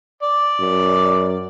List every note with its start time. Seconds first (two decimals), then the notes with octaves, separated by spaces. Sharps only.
0.23 D5
0.60 F#2